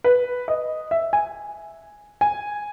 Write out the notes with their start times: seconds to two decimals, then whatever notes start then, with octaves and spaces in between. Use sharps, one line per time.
0.04 B4
0.48 D#5
0.91 E5
1.13 G#5
2.21 G#5